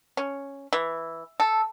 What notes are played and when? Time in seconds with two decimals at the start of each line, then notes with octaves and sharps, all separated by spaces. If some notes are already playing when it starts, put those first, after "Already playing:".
0.17 C#4
0.73 E3
1.40 A4